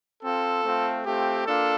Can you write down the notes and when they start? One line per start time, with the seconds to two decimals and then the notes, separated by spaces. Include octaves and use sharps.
0.22 C4 F4 A4
0.64 A3 C4 F4
1.05 A3 C4 F4 G4
1.46 A#3 D4 F4 A4